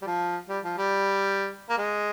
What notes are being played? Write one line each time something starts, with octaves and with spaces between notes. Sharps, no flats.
G3
F3
G3
F3
G3
A#3
G#3